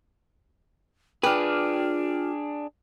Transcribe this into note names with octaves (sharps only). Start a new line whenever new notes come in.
D4 F4 G#4 B4 G5 D6 F6